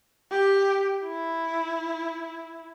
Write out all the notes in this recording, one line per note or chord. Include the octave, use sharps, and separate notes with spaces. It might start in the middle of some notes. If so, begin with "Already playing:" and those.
G4
E4